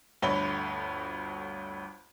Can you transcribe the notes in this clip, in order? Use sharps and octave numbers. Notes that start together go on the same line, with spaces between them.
G1 D2 C#5 B5 G7